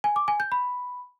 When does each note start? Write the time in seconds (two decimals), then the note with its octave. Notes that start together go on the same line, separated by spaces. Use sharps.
0.04 G#5
0.16 D6
0.28 G#5
0.40 G6
0.52 B5